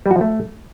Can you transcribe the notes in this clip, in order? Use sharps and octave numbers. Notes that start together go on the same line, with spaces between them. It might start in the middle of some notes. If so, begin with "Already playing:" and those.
G3
F#4
F3
A3